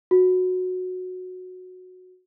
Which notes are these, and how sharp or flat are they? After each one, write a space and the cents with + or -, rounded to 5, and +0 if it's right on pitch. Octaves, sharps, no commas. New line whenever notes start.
F#4 -10